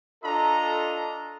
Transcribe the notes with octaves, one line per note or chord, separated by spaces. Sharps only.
D4 F4 A4 D#5 A#5